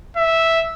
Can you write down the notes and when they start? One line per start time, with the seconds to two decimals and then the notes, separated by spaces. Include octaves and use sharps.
0.17 E5